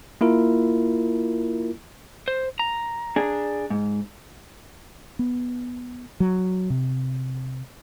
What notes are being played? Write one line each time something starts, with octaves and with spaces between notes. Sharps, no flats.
A#3 E4 F4 A#4
C5
A#5
D4 G#4
G#2
B3
F#3
C3